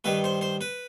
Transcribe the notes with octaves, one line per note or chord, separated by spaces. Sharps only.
G2 D#3 B4
C5
C5
B4